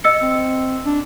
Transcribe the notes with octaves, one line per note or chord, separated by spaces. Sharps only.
D#5 E6 C#7
C4
D4